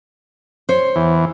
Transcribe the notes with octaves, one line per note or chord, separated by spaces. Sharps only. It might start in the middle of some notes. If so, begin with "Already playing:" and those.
C5 C#5
E2